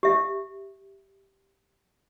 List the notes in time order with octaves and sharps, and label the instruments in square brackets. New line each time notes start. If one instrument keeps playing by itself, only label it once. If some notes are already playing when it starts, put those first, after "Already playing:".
[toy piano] G4 E5